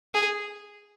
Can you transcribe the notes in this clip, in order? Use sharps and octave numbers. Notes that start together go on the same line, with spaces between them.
G#4